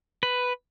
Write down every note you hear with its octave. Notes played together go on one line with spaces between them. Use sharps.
B4